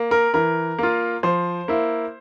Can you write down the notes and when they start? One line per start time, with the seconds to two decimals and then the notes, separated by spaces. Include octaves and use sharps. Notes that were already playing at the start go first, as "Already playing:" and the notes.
Already playing: A#3
0.11 A#4
0.34 E3 A#4
0.79 A#3 F4
1.23 F3 C5
1.68 A#3 E4